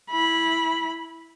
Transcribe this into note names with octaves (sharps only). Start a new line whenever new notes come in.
E4 B5